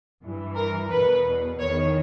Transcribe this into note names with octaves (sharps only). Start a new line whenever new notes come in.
G2 E3
A#4
E2 B2 B4
E2 D#3 C#5